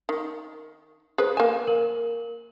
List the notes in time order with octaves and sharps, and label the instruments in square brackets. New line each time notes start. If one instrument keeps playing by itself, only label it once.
[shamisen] D#3
[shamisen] G#4 B4 [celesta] C5
[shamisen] A#3 G#5 [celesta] E7
[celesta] A#4 F#7